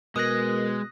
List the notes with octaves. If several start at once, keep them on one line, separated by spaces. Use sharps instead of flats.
B2 G#3 A#4 D#6 F#6 A#6